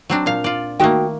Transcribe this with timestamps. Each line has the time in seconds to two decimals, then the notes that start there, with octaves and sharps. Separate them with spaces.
0.10 F#3 C4 D4
0.26 A#2 F5
0.44 F4 D5
0.80 D#3 A3 A#3 D#4 F#4 G5